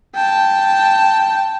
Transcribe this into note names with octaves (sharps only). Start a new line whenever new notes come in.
G5 A5